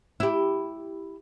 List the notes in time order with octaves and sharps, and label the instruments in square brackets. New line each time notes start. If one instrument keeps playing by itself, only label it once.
[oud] E4 G4